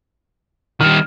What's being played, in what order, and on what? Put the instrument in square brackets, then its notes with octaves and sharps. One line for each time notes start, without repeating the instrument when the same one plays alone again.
[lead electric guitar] D#3 G3 [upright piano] F6